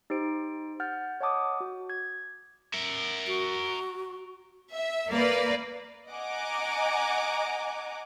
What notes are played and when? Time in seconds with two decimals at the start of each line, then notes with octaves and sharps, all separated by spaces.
0.10 D#4 G4 C5 D7
0.80 F#5 F6 G6 A6
1.21 C#5 D#5 F#5 A5 D6 D#6
1.60 F#4
1.90 G#6
2.74 A#4 E5
3.27 F#4
4.73 E5
5.12 A#3 B4 D5
6.11 D#5 F#5 G#5 A#5 D6